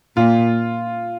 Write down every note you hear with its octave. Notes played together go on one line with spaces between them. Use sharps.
A#2 F4